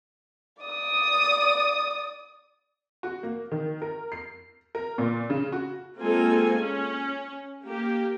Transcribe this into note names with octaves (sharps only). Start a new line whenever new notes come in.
D5 D#6
F#4
A#3
D#3
A#4
C7
A#4
A#2
C#3
F#4
G#3 A#3 C4 F4 A4 G#5
C#4
A#3 G4